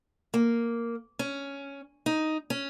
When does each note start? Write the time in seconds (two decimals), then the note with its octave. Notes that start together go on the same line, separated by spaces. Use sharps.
0.34 A#3
1.19 C#4
2.06 D#4
2.50 C#4